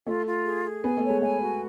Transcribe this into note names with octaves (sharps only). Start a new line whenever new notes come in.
A3 F4
F4
G#4
G#4
B3 G#5
A3
C#5
G#3
A3 G#5
F#4